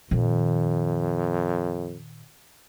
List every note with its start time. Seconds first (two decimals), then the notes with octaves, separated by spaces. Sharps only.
0.11 F2 A#2 D#3